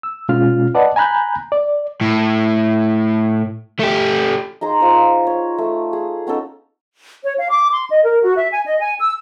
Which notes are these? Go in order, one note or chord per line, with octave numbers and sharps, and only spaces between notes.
E6
B2 G#3 C#4 F4 F6
B4 D5 D#5 F#5 A5
G#5 A#5 B5 F#6 G6
D5
A2
A3 G4
D#4 G#4 A#5 C6
F4 C5
C#5
A3
G#4
B3 C#4 D#4 A4
C#5
F5
D6
C6
D#5
A#4
F#4
E5
G#5
D#5
G#5
E6